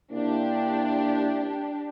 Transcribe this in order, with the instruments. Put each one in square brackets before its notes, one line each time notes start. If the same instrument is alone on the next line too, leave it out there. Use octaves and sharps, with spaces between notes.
[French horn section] C3 A#3 E4 [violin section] D4 G4